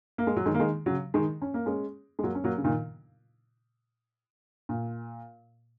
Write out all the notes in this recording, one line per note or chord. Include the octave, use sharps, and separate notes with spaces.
A#3
G#3
F#3
D#3 G#3
A#3
D#3 G#3
C#3 F#3
D#3 G#3
C#4
A#3
G#3 C#4
G#3
F#3 A#3
C#4
F#3 A#3
C#3
A#2 D#3
A#2